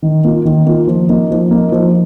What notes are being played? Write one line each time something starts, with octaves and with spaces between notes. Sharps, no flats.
D#3
A#3 F4
D#3
A#3 F4
F3
A#3 D#4
F3
A#3 D#4
F3